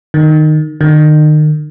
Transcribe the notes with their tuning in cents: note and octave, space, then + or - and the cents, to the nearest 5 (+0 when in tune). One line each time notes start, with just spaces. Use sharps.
D#3 -15
D#3 -35